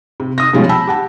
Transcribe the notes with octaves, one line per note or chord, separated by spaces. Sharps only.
C3
D#6 A#6
B2 F3 G3 G#3 C#4 F4
G5 A5 B5 E6
G4 F#5 A5